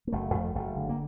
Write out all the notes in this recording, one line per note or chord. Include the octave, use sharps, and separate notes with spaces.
A#3
F#1 A3
F2 A3
F#1 A3
D3
A#3